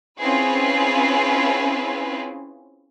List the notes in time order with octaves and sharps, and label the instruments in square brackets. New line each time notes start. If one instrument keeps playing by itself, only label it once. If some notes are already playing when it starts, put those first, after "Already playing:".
[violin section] C4 C#4 E4 F4 G#4 B4